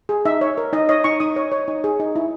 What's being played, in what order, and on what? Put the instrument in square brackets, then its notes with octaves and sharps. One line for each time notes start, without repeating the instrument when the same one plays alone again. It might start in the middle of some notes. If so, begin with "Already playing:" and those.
[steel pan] G#4
D#4 E5
C#5
A#4
D#4 D#5
C#5 D#5
D#4 C#6
D#4 D#6
C#5
C#5
D#4
G#4
D#4
E4